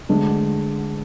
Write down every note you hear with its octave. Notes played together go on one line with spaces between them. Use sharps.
D2 D3 G#3 D4